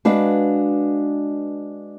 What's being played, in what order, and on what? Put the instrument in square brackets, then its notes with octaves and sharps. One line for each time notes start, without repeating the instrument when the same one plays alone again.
[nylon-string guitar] G#3 D4 F#4 B4 F5